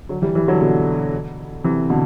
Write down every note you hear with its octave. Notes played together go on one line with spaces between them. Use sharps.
D3 F#3
E3 G3
E3 G3
D3 F#3
B2 D3
C3 E3
B2 D3